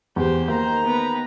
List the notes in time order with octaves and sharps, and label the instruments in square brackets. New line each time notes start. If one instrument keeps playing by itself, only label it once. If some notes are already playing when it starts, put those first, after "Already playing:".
[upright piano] E2 [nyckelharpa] G4 C5
[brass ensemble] D#3 A#5 [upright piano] A#3 [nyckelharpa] C5
[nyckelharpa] B3 B4